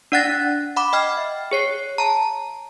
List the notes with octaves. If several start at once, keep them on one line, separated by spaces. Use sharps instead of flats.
D4 D5 F#5 F#6 A6 A#6
F#5 B5 D6
D#5 G5 F6
E5
G#4 C#5 C7
A5 A#5